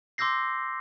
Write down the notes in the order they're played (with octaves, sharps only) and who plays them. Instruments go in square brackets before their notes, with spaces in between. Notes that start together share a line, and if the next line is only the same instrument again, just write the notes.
[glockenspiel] C6 D6 E6 G6 A#6 C7